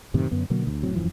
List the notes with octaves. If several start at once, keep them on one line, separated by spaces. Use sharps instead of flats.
F#2 A2 C3 D#3
F#2 D3 B3
B2 D3 F#3 A#3
D2
F1 A2 F#3 C4
E1 F#2 E3 F3